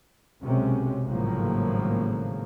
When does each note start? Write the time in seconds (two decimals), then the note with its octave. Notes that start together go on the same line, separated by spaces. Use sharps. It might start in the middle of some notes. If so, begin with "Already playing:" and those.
0.41 B1 F#2 C3 G#3 C#4
1.05 G#1 A2 C#3 F3 F#3 A#3